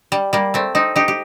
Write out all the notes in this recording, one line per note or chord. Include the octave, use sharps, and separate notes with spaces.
G3
G3 A#3
A3 C4
C4 D#4
D#4 G4
G4